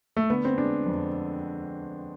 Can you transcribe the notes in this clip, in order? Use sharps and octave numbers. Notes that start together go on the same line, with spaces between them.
A3
D3 B3
C4
G#3 D4
F2